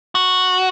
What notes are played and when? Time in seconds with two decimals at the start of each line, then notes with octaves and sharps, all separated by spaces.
0.15 F#4